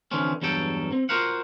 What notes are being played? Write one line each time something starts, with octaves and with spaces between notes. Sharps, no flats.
D3 E3 F3 C4 C#4
E2 G2 F#3 A4 G5
C4
F4 F#4 A#4 C5 F5 F#5